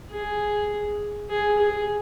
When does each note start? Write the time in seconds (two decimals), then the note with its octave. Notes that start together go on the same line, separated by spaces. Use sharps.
0.10 G#4
1.29 G#4
1.58 G#4